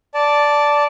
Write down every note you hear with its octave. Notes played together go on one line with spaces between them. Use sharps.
D5 A5